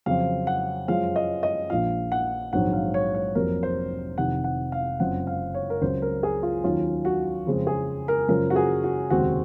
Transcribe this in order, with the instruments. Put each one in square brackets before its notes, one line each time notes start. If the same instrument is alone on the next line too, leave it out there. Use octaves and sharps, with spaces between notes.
[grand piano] F2 C#3 F#3 C4 F5
F#5
F#2 F3 G#3 C#4 F5
D#5
D#5
A#1 A#2 F3 F5
F#5
A#1 G#2 D#3 F#3 C4 F#5
F5
C#5
C#5
F1 F2 C3 F#3 A#3 A#4
C5
F1 F2 C3 D#3 F#5
F#5
F5
F#1 F#2 F3 C4 F#5
F5
C#5
A#4
C#2 C#3 F#3 C4 C5
A#4
G#4
F4
D#2 D#3 F#3 C#4 F4
F#4
F2 C#3 G#3 C4
G#4
A#4
F#2 C#3 F3 G#3 A#4
F#4
G#4
F#4
F1 D#2 C#3 G#3 C4 F#4